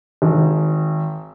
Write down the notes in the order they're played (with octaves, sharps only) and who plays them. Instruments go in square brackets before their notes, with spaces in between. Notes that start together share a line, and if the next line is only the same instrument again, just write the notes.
[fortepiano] G#1